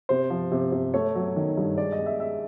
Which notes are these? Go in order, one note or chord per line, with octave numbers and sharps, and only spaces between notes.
C3 C5
F3
C3
C3
A3 C#5
F#3
D#3
G2
G#3 D5
D#5
G#3
E5
G#3 E5